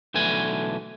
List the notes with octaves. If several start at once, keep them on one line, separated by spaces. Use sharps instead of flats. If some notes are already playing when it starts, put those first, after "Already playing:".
B1 D3 E3 A3 G#5